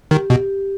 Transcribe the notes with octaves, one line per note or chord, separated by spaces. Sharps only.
D#3 G4
B2 G4